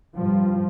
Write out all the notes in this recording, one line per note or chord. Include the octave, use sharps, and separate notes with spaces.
G2 F3